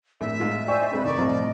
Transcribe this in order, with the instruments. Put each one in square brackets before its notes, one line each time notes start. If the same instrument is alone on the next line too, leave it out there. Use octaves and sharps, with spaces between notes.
[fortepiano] A#1 [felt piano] A2 [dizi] E5
[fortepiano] G#2 F4
[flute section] C5 D5 G#5 [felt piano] D#5 G5 C#6
[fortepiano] G2 C3 G#3 [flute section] B4 B5
[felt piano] F1 [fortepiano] D#3 D#4 [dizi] D5 [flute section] C#6
[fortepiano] C2 F3 [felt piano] A2 A#5 [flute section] D#5